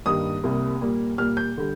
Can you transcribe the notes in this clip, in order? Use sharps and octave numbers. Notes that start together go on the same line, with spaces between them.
G2 D#3 G3 A#3 D#6
C2 C3 G3 A#3
A#2 G3 A#3
A#2 G3 A#3 F6
G6
D3 G3